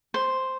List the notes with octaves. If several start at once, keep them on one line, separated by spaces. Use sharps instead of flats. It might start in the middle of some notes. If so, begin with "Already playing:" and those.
C5